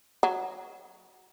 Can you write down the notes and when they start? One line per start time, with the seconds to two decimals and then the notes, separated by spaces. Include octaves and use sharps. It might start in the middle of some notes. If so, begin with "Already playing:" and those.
0.23 F#3